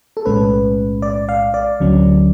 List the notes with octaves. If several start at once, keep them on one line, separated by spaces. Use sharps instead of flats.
A4
B1 A2 G#3 C#4 B4
D5
F5
D5
D2 D3 F#3 C#4